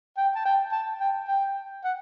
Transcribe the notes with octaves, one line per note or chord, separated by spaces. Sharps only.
G5
A5
G5
A5
G5
G5
F#5